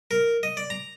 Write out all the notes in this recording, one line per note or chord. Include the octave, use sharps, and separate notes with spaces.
A#4
D#5
D5
A#5